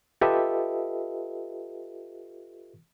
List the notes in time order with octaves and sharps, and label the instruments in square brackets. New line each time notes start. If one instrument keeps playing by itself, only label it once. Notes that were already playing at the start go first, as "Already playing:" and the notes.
[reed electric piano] F4 G4 A4 B4 D#5 E5